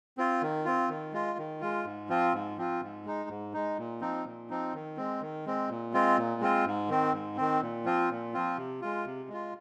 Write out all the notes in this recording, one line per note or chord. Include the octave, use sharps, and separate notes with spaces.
C4 F4
D#3
C4 F4
D#3
G#3 F4
D#3
G#3 F4
G#2
F3 C4 F4
G#2
F3 C4 F4
G#2
G#3 D#4
G#2
G#3 D#4
A#2
F3 C4 D#4
A#2
F3 C4 D#4
D#3
G#3 C4
D#3
G#3 C4
A#2
G#3 C4 F4
A#2
G#3 C4 F4
G#2
D#3 C4
G#2
D#3 C4
A#2
F3 C4 F4
A#2
F3 C4 F4
C3
G#3 F4
C3
G#3 F4